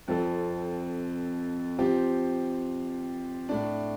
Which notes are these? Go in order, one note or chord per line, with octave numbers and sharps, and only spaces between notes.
F2 F3 C4 A4
F3 C4 G4
A2 A3 D4